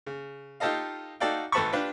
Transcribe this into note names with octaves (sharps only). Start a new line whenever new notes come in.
C#3
D#4 F4 G4 A4 D#5 F5
D#4 F#4 A4 D5 F5 G5
G#1 A4 B4 A5 B5 C#6
D4 F4 G4 B4